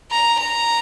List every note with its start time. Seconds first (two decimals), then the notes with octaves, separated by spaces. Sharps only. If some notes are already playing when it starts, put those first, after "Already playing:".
0.11 A#5
0.40 A#5